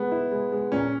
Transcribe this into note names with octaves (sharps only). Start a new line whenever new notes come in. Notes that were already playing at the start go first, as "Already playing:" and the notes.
Already playing: G#3 B3
E4
G#3
G#3
A#2 C#4